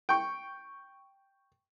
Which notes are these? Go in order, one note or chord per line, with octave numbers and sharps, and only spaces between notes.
G5 C#6